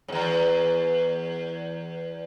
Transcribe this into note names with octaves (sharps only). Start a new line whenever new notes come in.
E2 G#2